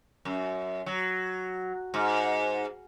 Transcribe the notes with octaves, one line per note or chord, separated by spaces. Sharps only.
F#2
F#3
G#2